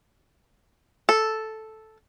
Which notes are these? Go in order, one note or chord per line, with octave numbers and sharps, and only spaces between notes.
A4